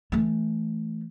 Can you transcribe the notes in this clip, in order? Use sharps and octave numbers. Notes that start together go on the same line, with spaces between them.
E3 A3